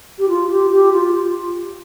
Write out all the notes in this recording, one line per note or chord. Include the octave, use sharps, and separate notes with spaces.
G4
F4
G4
G4
F4